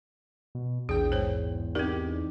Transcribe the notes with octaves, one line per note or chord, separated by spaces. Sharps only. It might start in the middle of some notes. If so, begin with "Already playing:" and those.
B2
A#1 E2 G#4 G5
G#2 C5 C#5
C4 D#4 G4 A#4 D5